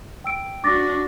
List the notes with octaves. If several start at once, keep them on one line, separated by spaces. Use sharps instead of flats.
G5 E6 D7
D4 F#4 D6 A6 A#6